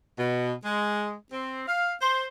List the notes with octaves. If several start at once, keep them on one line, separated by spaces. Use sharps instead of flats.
B2
G#3
C4
F5
C5